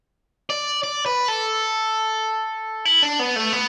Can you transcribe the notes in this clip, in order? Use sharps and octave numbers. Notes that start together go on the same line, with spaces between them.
D5
D5
B4
A4
E4
D4
B3
A3
B3